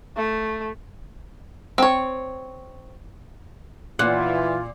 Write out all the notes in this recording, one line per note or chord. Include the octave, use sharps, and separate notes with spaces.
A3
C4 C#5
A#2 E3 F4 F#5